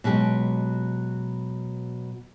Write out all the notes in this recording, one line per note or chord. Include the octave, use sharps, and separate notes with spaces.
B2 F#3 G#3 G4